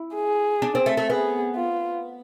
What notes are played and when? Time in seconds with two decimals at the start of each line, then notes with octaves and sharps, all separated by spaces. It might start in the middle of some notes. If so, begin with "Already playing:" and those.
Already playing: E4
0.16 G#4
0.62 D4
0.75 C4
0.86 A3
0.97 A3
1.09 B3 G#4
1.56 F4